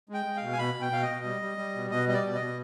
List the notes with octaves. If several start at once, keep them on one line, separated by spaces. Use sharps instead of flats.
G#3
G5
G#3
F5
B2
G#5
B2 B5
B2
G5
B2 F5
D#5
B2
G3
G3
G3
B2
B2 D#5
G3 D#5
D5
B2
D#5
B2